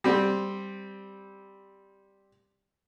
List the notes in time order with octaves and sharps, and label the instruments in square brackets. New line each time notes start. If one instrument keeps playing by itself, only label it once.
[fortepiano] G3 C4